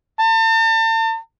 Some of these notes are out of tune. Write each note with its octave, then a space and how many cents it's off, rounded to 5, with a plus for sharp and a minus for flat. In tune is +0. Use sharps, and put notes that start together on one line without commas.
A5 +40